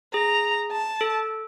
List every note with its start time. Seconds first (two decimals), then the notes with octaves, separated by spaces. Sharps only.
0.14 G#4 A#5
0.72 A5
1.01 A4